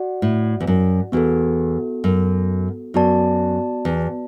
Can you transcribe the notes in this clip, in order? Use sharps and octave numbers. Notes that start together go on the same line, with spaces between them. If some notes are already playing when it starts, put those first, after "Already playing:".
Already playing: F#4 D5 F#5
A2
E2
F#2
E2 B3 F#4 A4
F#2
F#2 B3 F#4 D5 A5
E2